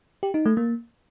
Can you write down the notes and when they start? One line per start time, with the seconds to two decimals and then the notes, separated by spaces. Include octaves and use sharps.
0.23 G4
0.34 D#4
0.46 A3
0.57 A#3